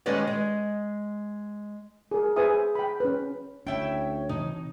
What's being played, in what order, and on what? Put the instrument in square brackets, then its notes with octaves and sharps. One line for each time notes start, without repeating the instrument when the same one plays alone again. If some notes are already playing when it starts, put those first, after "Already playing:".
[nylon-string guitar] D#3 G#3 C#4 G4 B4 D5
G#3
[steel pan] G#4 A#4
G#4 B4 C5 E5 G#5 D#6
G5 B5
C#4 B4
[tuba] D2 [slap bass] C#4 [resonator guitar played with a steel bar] E4 E5 G5 [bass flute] C#5
[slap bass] C3 E3 [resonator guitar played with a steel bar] D#4